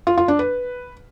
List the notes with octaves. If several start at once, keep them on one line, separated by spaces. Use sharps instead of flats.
F4
F4
D4
B4